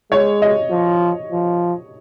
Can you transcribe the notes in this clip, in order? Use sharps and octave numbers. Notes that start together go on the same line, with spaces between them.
G#3 C#5
D#5
F3
F3